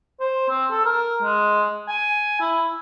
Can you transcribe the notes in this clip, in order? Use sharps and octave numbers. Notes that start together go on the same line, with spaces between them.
C5
C4
A4
A#4
G#3
G#5
E4